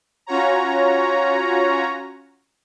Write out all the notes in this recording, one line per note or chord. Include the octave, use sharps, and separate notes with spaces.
C#4 F4 F#4 C#5 A#5